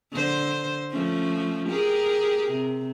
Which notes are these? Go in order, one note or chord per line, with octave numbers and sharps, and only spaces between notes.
D3 C5
F3 A3 C#4
G4 G#4 A#4
C3